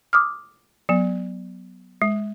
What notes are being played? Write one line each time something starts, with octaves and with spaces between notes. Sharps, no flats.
D6 D#6 F6
F#3 B3
G#3